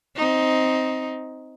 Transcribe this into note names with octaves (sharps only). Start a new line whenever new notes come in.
C4 D#4